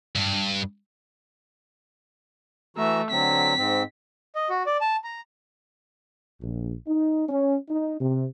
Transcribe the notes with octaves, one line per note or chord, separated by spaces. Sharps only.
G2
E3 A3 F#4 E5 A#5
D3 F#3 C4 B6
G#2 C4
D#5
F#4
D5
A5
A#5
A#1
D#4
C#4
D#4
C3